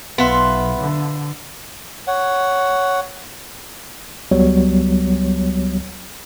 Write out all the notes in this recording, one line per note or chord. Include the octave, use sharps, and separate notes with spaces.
B1 B3 F4 E5 C6
D3
C#5 F#5
C#2 F#3 G3 B3 C#5